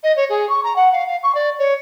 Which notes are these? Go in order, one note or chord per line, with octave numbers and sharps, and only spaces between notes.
D#5
C#5
G#4
C#6
A#5
F#5
F5
F5
C#6
D5
C#5